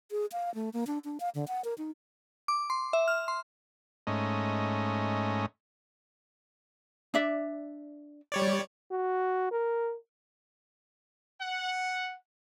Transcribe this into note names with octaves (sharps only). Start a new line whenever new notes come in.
G#4
F5
A3
A#3
D4
D4
F5
D3
F#5
A#4
D#4
D6
C6
E5
F6
C6
G#2 A3 C#4 D#5
D4 D5 E5
G3 C#5 D5
F#4
A#4
F#5